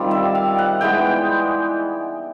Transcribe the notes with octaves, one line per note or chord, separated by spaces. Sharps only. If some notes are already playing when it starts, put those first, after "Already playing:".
Already playing: D#3 G3 C4 F4 D5
E5
F5
F#5
E3 G#3 B3 G5